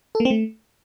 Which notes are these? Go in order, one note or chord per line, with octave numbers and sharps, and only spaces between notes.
A4
A#3
C4
A3